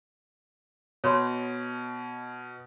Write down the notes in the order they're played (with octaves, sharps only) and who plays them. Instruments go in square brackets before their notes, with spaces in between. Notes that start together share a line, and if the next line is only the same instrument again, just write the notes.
[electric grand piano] B2 [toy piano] C#5 B5 C6